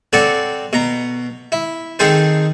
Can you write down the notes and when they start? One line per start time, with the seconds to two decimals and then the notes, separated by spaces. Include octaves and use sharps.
0.13 C4 F#4 A4 C#5 D5
0.73 B2 A#5
1.52 E4
1.99 D#3 C4 D#4 G#4 A4 C5